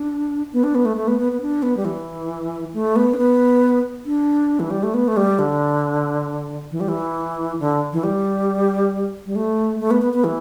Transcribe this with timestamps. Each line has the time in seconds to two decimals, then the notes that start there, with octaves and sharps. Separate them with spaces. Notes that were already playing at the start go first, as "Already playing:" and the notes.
Already playing: D4
0.53 B3
0.64 D4
0.75 B3
0.85 A3
0.97 A3
1.08 B3
1.19 B3
1.32 B3
1.41 D4
1.63 B3
1.77 G3
1.85 E3
2.74 A3
2.96 B3
3.14 D4
3.18 B3
4.06 D4
4.60 E3
4.70 G3
4.83 A3
4.94 B3
5.08 A3
5.17 G3
5.39 D3
6.71 E3
6.80 G3
6.89 E3
7.60 D3
7.93 E3
8.03 G3
9.26 G3
9.36 A3
9.80 A3
9.91 B3
10.02 B3
10.13 B3
10.24 E3